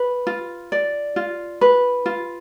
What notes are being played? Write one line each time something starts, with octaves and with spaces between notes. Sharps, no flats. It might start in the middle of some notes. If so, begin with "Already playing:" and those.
Already playing: B4
F4
D5
F4
B4
F4